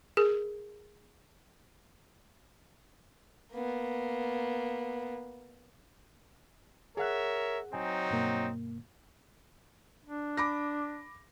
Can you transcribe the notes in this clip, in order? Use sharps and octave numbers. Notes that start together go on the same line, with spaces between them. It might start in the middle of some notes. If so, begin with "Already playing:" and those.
G#4 A#4
A#3 B3
G#4 A#4 C#5 E5 F#5 F#6
F#3 C4 D#4 G#5
G2 B2 A#3
D4
B5 D6 A#6